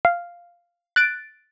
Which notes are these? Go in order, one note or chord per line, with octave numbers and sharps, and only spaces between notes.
F5
F#6 A6 D7